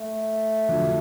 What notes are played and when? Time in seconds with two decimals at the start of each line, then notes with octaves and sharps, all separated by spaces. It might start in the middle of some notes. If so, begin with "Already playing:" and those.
Already playing: A3
0.68 F2 D3 F#3